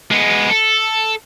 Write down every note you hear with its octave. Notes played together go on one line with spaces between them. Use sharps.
G#3 B3
A4